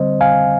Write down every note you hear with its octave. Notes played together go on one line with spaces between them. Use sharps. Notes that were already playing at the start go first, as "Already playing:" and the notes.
Already playing: D3 G3 C4 C5 D#5
F5 G#5